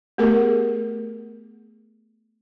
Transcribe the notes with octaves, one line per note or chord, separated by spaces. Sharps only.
A3 B3 G4 G#4 A#4